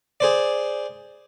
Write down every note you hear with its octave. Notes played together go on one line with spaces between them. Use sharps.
G#4 C5 D5